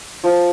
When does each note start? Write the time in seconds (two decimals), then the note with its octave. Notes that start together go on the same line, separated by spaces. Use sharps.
0.24 F3